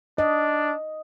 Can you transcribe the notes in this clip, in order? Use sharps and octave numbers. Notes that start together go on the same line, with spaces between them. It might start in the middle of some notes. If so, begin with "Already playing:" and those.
D4 D#5